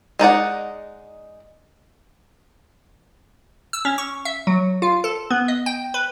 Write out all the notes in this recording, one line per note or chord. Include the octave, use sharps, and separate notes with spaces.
G#3 D#4 D5 F#5
E6
C#4
C#6
E5
F#3
F4
A4
B3
D#5
G5
B4